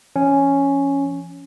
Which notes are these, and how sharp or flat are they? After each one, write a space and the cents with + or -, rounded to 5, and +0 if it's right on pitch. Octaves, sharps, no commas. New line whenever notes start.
F3 -30 C#4 +0